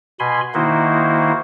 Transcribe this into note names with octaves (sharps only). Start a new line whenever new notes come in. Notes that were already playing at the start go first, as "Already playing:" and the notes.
B2 G#5 B5 C6
D#3 A#3 D#4 E4 F#4 C5